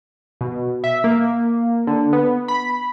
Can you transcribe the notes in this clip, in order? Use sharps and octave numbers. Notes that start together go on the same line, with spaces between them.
B2
E5
A#3
D3
B3
B5